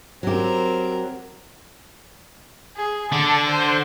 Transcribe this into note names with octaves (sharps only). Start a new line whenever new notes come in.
F#3 C4 G4 A#4
G#4
D3 D5 A5
C5